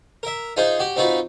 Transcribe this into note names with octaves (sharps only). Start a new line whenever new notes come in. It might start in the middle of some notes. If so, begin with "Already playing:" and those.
A#4 E5
D#4 F4 G#4 C5
F#4 G4
C4 D#4 F4 F#4 B4